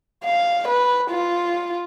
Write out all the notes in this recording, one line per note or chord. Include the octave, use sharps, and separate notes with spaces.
F5
B4
F4